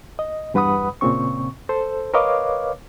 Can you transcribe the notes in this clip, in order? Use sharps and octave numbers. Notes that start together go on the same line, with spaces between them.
D#5
E2 G2 B4 F#5 B5 D#6
A#2 C#3 C4 C#6
A4 C5
A#4 B4 C#5 D#5 F5 D6